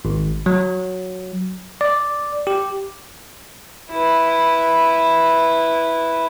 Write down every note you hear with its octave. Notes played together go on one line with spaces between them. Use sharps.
G#1
F#3
D5
G4
E4 B4